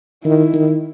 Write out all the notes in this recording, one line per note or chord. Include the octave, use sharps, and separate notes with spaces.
D#3 E4
D#3